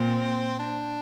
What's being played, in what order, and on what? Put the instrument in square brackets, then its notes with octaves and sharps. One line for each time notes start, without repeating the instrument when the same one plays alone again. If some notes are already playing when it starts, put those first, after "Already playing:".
Already playing: [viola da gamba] A#2 [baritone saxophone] C4
[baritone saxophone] D4